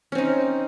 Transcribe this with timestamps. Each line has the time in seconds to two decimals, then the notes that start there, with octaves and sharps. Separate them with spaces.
0.12 C#4
0.15 C4
0.18 D#4